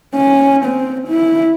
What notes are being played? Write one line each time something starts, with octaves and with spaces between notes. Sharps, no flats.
C#4
C4
E4